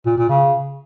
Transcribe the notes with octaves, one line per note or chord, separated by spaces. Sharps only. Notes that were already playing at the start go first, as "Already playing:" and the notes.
A#2
A#2
C#3